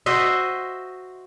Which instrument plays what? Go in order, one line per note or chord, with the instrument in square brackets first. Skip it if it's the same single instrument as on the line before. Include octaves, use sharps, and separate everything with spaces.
[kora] F#4 C5 D#5 E5